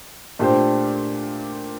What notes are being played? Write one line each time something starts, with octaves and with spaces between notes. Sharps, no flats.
A#2 A3 D4 G4 C5